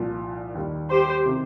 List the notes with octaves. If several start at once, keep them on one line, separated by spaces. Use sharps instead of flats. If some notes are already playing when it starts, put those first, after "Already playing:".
Already playing: C2 A#2 F3
D#2 D#3 G3
G4 C5
C3 D#3 C4 G4